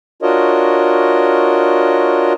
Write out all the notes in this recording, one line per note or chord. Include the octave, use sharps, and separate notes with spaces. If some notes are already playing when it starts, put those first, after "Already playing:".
D4 F4 F#4 A#4 C#5 D#5